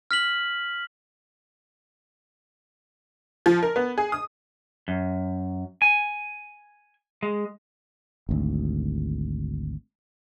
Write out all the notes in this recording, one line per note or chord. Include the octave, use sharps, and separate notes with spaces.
F6 B6 F#7
F3
A#4
B3
G#4
D#6
F#2
G#5
G#3
G#1 D2